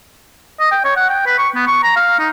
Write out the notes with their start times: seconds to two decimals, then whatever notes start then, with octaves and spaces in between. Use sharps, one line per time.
0.60 D#5
0.71 G5
0.84 C#5
0.96 F#5
1.09 G5
1.26 B4
1.38 C#6
1.55 B3
1.67 C#6
1.83 A#5
1.96 F5
2.19 D#4